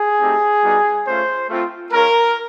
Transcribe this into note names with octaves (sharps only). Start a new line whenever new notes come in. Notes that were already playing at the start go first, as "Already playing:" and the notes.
Already playing: G#4
A3 C4 D#4 G4
G3 B3 D#4 F#4
A3 C#4 F4 C5
A3 C4 F4
G#3 C#4 F4 A#4